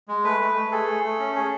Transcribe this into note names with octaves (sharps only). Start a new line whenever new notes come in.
G#3
A3 B4
A3
A3
G#4 A4
A3
A3
C#4
G#4